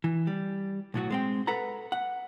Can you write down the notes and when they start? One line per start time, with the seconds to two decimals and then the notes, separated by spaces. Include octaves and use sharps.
0.04 E3
0.27 G3
0.94 B1 A2 F#3 F#4
1.10 G#3 C4 G5
1.47 A4 B4 F#5 A#5
1.92 F#5